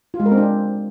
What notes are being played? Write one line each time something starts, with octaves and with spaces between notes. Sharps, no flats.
F4
G#3
A#4
C4
D4